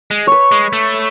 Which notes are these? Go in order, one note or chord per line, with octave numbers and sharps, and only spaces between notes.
G#3
B4 C#5
G#3
A3